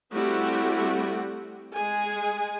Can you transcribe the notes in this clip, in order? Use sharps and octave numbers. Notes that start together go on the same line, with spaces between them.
G3 A3 C4 E4 F#4
G#3 G#4 G#5